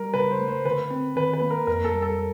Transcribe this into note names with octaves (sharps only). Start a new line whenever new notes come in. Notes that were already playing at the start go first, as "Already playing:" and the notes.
Already playing: G3 A#4
C#3 B4
C5
A3
C5
D3 B4
C4
D#3 B4
B4
A#3
A#4
F2 A#4
A4
G3
A4